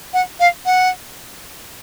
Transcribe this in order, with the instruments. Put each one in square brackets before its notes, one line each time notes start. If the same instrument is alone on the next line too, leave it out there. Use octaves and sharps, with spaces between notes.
[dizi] F#5
F5
F#5